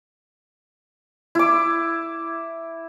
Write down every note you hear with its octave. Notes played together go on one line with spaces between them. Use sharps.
E4 D6